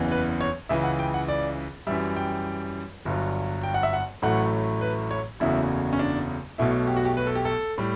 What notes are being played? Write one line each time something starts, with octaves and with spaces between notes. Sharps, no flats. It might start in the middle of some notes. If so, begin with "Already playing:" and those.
Already playing: F#1 E2 C#3 E3
B4
C#5
C#2 C#3 E3 E5
F#5
G5
F#5
D5
F#2 E3 G3 E5
G5
G1 G2 F#3
G5
F#5
E5
F#5
A1 A2 F#3 A3 F#5
B4
C#5
F#1 E2 C#3 F#3 A3 E4
C#4
D4
B1 B2 A3 E4
G4
F#4
G4
B4
A4
G4
A4
A2 G3